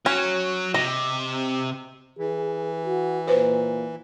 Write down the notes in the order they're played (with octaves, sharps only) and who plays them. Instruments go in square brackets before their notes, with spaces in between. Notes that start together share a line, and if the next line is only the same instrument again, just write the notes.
[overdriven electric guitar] F#3 [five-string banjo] C#4
[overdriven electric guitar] C3 [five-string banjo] D#5
[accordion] E3 [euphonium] G#4
[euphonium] F#4
[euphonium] A#2 [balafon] B4 C5